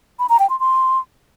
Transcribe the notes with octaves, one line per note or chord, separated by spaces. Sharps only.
B5
A#5
G5
C6
C6